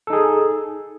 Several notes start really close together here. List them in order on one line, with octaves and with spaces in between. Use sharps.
A4 D#4 G#4